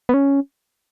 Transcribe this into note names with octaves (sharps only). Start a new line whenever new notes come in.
B3
C#4